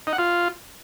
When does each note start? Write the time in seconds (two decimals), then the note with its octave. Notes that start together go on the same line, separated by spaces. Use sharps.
0.07 D#4
0.13 F#5
0.18 F4